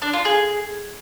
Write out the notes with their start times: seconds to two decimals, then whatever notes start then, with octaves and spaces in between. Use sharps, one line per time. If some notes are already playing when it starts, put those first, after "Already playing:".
0.02 D4
0.13 F4
0.25 G#4